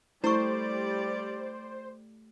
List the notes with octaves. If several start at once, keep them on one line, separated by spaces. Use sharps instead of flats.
G3 A3 E4 C5 D5 C#6